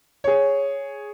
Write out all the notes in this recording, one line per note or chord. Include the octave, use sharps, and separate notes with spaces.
G#4 C#5